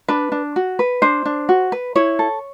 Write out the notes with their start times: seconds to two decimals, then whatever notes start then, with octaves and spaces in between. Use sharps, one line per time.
0.08 D4 B4
0.32 D4
0.56 F#4
0.79 B4
1.02 D4 C5
1.26 D4
1.49 F#4
1.72 B4
1.95 E4 C#5
2.19 A4